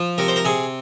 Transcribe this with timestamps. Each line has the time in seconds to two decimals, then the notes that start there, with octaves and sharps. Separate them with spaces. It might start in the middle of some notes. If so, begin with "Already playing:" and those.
Already playing: F3
0.18 C3 A#4
0.28 C5
0.36 A#4
0.45 C3 G#4